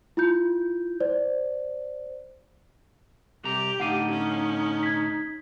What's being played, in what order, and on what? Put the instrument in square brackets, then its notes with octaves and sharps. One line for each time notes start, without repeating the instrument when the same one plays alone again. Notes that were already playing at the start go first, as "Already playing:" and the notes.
[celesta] E4 F4 G6
C5 D5
[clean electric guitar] C2 C3 A#5 [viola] G4
[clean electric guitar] A2 D3 F5 [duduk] D#4 [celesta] F#5 D#7
[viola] C#4
[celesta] G#6 B6